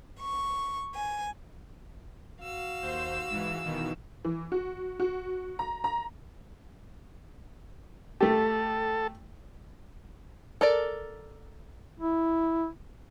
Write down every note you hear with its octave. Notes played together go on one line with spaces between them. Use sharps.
C#6
G#5
F#4 F5 E6
D#2 C5
G#2 E3
B2 D#3 E3
E3
F#4
F#4
A#5
A#5
A3 G4 A4
A4 A#4 D5
E4